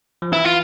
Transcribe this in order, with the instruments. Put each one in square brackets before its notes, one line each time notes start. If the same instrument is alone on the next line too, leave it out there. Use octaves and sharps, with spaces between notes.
[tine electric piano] F3
[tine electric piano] E3 [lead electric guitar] E4
[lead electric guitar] F4